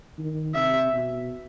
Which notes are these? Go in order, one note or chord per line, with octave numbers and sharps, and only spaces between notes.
D#3
C3 E5
B2